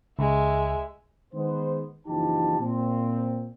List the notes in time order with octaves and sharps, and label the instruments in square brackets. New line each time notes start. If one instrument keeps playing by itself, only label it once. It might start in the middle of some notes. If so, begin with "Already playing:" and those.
[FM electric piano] C#2 [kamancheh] G#3 E5
[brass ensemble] D#3 G#3 B3 C5
F#1 E3 F3 D#4 G4 A5
A#2 C4